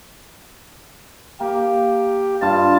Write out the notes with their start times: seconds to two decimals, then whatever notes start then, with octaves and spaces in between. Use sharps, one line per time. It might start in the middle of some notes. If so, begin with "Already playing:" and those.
1.40 A#3 G4
2.41 G2 F4 A5